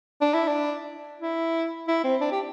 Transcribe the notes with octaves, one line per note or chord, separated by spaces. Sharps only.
D4
E4
D4
E4
E4
C4
D4
G4